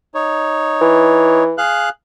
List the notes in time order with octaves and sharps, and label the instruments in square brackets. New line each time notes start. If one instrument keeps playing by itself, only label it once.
[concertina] D#4 C#5
[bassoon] E3
[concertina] G#4 F5 F#6